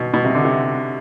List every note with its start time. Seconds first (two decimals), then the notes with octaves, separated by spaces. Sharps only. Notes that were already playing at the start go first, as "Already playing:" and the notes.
Already playing: B2
0.14 B2
0.24 C3
0.35 D3
0.45 C3